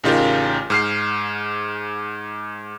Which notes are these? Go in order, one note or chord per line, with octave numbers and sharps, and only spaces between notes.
A1 C#3 D#4 F4 G4 A#4
G#2 F6 C7